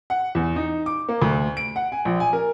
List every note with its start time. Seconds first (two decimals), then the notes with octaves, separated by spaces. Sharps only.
0.10 F#5
0.35 E2
0.56 D#4
0.86 D6
1.09 A#3
1.22 D2
1.57 D7
1.76 F#5
1.92 G#5
2.05 A#1
2.20 G#5
2.33 A#4